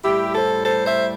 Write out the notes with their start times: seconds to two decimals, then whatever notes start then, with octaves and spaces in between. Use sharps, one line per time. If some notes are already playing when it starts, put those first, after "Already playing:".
0.04 A2 G3 E4 G4
0.34 A4 C5
0.65 A4 C5
0.86 C5 E5